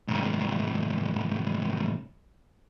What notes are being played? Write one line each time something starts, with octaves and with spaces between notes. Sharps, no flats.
C2 G#2